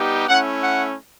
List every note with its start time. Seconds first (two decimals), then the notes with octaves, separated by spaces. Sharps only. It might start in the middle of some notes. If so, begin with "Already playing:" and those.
Already playing: G3 B3 D#4 G4
0.27 A3 C#4 E4 F#5
0.61 F#5